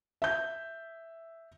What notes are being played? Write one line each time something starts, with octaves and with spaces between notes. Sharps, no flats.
E5 G6